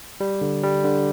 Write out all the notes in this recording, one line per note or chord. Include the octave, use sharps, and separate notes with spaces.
G3
D3
G3
D3